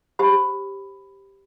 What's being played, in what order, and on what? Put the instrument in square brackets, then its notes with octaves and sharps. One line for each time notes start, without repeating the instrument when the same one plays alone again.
[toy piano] G4 C5 B5